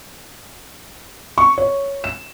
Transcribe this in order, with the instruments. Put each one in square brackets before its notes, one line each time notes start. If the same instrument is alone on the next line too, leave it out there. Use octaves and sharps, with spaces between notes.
[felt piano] C#6
C#5
E7